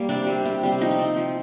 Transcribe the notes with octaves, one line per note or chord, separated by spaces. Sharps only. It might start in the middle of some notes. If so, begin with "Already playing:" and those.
Already playing: G3 A#3
C3 D4
G3 C4
C3
G3 C4
F3 D#4
C4
F3